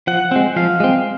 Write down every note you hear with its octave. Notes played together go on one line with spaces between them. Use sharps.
F3 F#5
G#3 C4
F3 F5
G#3 C4